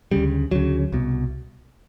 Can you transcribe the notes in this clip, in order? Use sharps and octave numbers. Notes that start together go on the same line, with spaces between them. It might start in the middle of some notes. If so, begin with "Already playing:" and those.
D2 C#3 G3
D2 C#3 F#3
C2 B2